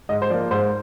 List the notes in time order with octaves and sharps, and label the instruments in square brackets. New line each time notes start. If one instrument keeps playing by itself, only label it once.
[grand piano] G#2 [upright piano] D#5
[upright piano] C5
[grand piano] F3 A#3 [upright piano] D5
[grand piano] G#2 [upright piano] C5